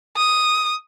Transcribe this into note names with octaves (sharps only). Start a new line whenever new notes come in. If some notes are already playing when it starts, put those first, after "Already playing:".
D#6